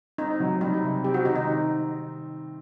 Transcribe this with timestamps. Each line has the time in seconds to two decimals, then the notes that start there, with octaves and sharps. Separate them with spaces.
0.18 C4 D#4
0.40 F#3
0.61 G3 D#4
0.83 C3
1.04 C4 G4
1.14 F#4
1.25 D#3 D#4
1.36 D#4